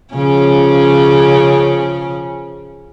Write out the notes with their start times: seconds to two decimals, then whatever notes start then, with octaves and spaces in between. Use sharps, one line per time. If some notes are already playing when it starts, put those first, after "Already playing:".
0.14 C#3 F3 C#4